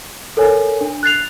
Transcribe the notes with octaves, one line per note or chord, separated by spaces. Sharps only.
A4 A#4 C#5 G#5
D4
F#6 A6 C7 F7